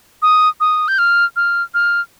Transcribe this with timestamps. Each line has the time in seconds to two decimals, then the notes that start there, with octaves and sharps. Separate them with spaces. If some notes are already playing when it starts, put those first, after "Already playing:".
0.22 D#6
0.60 D#6
0.88 G6
0.98 F6
1.36 F6
1.74 F6